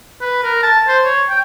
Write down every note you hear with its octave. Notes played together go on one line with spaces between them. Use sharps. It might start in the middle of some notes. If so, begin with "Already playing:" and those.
B4
A#4
A5
C5
C#5
G5